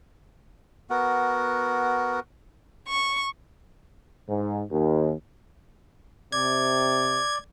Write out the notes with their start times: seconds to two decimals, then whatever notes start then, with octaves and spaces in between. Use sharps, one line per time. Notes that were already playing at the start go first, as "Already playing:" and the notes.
0.90 B3 F#4 A#4 F#5
2.88 C#6
4.29 G#2
4.71 D#2
6.32 C3 D5 G#6